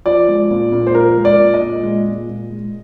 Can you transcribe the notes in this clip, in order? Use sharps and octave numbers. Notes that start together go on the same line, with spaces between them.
F3 D5
G#3
A#2
A#2
C5
F3 A#4
G#3
D5
A#2
D#5
A#2
G#3
A#2
A#2
G#3